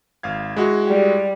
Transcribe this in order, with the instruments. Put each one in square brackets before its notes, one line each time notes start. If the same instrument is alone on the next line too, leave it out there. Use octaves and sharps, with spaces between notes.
[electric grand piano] G#1 F5 G#6
G#3 E4 F#4
[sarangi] G3